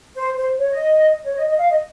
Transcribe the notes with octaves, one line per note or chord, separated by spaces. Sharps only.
C5
C5
C#5
D#5
C#5
D#5
D#5
F5
D#5